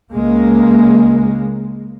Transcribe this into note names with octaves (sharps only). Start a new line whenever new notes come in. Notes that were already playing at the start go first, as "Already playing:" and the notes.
C#2 G#3 A#3